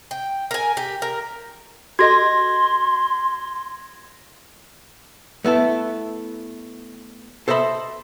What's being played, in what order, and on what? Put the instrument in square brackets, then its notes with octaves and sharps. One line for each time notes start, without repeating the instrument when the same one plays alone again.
[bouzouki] G5
A#4 G#5
G4
A#4
[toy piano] F#4 A4 D#5 [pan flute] C6 [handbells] G#6 A#6
[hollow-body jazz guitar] A3 B3 E4 A4
A4 C5 D#5 E5 B5